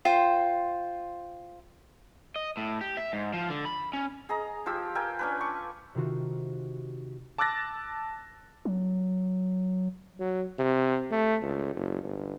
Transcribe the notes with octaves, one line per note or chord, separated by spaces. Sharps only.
F4 C5 G5
D#5
A2
G4
E5
G#2
F3
D3
B5
C#4
G#4 D#5 A#5
F3 F4 G4 E6
A4 A#4 G5 G#5
C#4 D4 B4
C#6 D6
C3 D#3 F4 F#4
A5 D6 E6 F#6 A6 A#6
F#3
F#3
C3
A3
C#2
F#1
G1